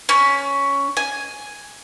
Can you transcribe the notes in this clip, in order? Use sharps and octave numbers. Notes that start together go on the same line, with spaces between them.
C#4
G#5